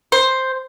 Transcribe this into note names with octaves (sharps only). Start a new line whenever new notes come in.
C5